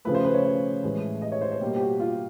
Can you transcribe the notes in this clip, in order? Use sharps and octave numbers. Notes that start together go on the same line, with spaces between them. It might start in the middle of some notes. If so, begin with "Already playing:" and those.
C#3 F3 A3 B4
C5
B4
C#5
C#5
A2 E3 G#3
D#5
C#5
C5
C5
B2 G3 A#3 G4
G4
F#4
F4